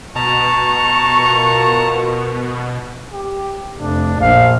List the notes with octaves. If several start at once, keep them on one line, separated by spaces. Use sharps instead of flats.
B2 A5 A#5 C#6
F4 F#4 A#4
G4
F1 D4
A#1 F5